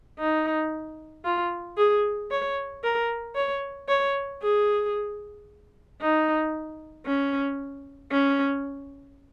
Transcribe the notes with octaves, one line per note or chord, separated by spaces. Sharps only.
D#4
F4
G#4
C#5
A#4
C#5
C#5
G#4
D#4
C#4
C#4